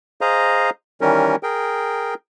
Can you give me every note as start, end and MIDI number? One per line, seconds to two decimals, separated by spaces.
0.21 0.70 68
0.21 0.70 72
0.21 0.70 75
0.21 0.70 77
0.21 0.70 82
1.01 1.36 51
1.01 1.36 52
1.01 1.36 55
1.01 1.36 61
1.01 1.36 70
1.43 2.14 68
1.43 2.14 70
1.43 2.14 79